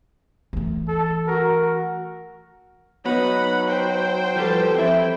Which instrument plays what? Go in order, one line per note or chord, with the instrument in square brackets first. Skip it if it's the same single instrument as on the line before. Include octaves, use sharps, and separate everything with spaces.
[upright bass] E3 A3
[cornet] A4
[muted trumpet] F#4 [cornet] A#4
[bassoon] F#3 [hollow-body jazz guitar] B3 D#4 [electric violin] F#5 B5
[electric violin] C5 G5
[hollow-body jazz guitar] F3 G3 [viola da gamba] G4 A4 B4
[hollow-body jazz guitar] F2 E5 [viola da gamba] C4 C5 [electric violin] E4 G5